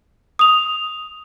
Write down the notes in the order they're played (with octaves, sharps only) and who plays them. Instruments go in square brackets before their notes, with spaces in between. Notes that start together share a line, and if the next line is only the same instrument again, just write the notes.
[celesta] D#6 F7